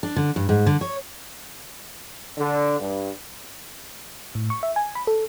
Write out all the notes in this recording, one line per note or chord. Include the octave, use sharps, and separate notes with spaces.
D4
D3
G2
G#2
D3
C#5
D3
G2
A2
C#6
E5
G#5
B5
A4